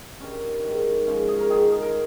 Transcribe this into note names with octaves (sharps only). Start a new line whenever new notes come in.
G2 D#3 C#4
G#2 D#3
G#2 F3 C#4
G#4
A#4
G#2 D#3 G#4
G#4
A#4